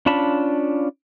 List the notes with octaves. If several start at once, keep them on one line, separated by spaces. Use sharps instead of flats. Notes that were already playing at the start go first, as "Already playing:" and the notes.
C#4 D4 F4 A5 B5